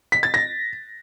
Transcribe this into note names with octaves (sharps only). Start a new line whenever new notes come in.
B6
A6
A#6